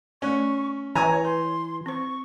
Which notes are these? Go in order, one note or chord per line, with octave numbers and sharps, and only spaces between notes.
A3 C#4 D5 C#6
E3 C#5 G#5 A#5
B4 C6
C4 C5 C#6